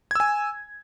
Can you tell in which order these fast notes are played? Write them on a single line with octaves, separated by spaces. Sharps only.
G#6 E6 G#5